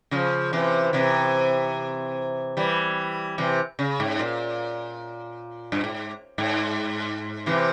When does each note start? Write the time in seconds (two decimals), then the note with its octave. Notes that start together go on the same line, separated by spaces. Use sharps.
0.11 C#3 F3
0.53 C3 E3
0.93 C3 E3
2.57 E3 G3
3.38 C3 E3
3.79 C#3
4.00 G#2
4.19 A#2
5.72 G2
5.84 G#2
6.38 G#2
7.46 C3 E3